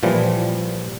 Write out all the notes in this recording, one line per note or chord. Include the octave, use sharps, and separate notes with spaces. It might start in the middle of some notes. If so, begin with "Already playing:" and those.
A#2 E3 F3 G3